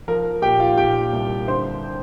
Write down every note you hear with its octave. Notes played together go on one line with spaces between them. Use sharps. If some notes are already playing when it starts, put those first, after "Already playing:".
F3 A#4
A#2 G4 G5
F4 F5
A#2 G4 G5
C2
D3 C5 C6